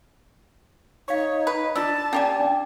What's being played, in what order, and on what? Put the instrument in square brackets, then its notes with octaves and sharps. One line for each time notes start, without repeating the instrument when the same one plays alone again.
[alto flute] D#4 [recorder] C#5 [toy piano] F5 C#6
[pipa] B4
[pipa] D4 [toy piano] F4 D6 E6 [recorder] A5
[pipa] A#3 G4 G#5 [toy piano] C#4 [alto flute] D5
[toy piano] D4 G5